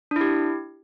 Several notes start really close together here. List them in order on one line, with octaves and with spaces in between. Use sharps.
D4 E4 G4